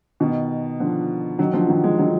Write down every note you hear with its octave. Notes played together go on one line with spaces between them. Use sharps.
B2 D#3
D3 F3
D#3 F#3
D3 F3
D#3 F#3
F3 G#3
D#3 F#3